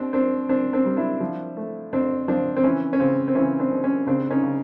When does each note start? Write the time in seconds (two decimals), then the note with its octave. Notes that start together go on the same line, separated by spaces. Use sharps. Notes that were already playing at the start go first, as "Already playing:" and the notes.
Already playing: D#2 C4 D4
0.13 C4 D4
0.49 C4 D4
0.73 C4 D4
0.85 G3
0.97 D4 E4
1.20 F3
1.57 A3
1.93 F2 C4 D4
2.28 F3 C4 D4
2.56 C4
2.64 E3 C#4
2.93 C#4
3.00 C#3 C4
3.28 C4
3.35 E3 C#4
3.59 C4 D4
3.71 D#2
3.84 C#4
4.07 C#3 C4 D4
4.30 C#4 D#4
4.42 C#3